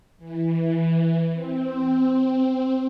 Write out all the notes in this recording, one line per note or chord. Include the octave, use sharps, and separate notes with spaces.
E3
C4